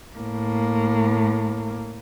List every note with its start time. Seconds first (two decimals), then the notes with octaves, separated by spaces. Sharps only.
0.17 A2 A#3